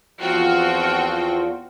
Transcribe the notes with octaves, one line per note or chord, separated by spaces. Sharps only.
E2 F3 C4 F4 F#4 G5